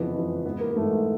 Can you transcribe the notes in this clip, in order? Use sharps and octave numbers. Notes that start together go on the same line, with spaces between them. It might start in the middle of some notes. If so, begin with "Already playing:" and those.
Already playing: F2 C#3 E3 B3
F2 C#3 E3
G#2 E3 B3
A#3
A#3
G#2 E3 A3
A3